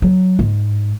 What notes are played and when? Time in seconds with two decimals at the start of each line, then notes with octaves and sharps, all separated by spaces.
0.02 F#3
0.39 G#2